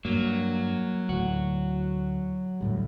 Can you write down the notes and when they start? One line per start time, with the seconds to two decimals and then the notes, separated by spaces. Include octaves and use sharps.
0.05 G2 F#3 A#3
1.09 D2 A2 F#4
2.61 D2 A2 G3